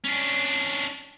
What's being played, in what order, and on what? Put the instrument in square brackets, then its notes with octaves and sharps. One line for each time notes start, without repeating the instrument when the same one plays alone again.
[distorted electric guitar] C#4 D4